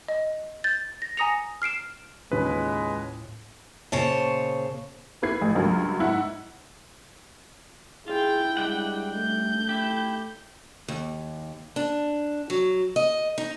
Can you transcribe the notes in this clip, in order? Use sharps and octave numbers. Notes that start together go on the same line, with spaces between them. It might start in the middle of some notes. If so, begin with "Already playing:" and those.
D#5
G6 A6
A#6
G#5 A#5 D#6 A#6 C#7 F7
F6 C7 D7 E7
D#2 A2 C#3 G#3 F4 B4
A#2 C#3 C5 C#5 A5
A#3 E4 B4 B5 G#6 C7
A1
C#2 G2 F#3 A#3
G#2 E4 F#5
E4 F4 G#4 G5
G3 G#3 D4 F#5
A3 G6
E4 G4
D#2
D4
F#3
D#5
D#4